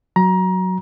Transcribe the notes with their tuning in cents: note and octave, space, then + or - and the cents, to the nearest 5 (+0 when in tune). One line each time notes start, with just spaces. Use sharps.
F#3 +0 A#5 +25